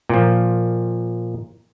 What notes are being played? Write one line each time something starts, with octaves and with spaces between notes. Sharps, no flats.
A#2 F3